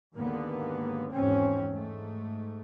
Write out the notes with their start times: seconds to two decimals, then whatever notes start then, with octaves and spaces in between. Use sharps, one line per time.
0.16 D#2 G#2 D3 A#3 B3
1.11 G#1 E2 G#2 C4 C#4
1.71 G#2 A3